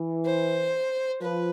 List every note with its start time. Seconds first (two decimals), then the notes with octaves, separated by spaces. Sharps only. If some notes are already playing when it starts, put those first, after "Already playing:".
Already playing: E3
0.25 C5
1.22 F3 B4